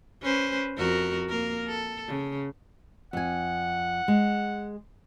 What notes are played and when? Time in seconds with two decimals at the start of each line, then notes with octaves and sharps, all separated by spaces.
0.22 C#4 B4 C5
0.78 F2 F#4 A#4
1.29 A#3 A#4
1.68 A4
2.08 C#3
3.13 F2 F#5 G#5
4.08 G#3